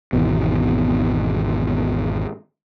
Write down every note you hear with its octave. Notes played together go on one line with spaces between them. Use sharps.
G#1 E2 B2